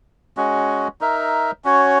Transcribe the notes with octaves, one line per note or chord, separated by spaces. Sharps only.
G#3 C#4 F#4
D#4 A#4 E5
C#4 F#4 C#5